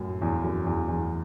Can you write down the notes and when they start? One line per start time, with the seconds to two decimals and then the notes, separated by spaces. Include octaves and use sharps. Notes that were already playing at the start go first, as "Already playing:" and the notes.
Already playing: F#2 A2
0.22 E2
0.44 F#2
0.66 E2
0.88 E2